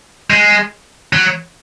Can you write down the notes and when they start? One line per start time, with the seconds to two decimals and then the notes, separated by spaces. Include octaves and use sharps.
0.30 G#3
1.13 F#3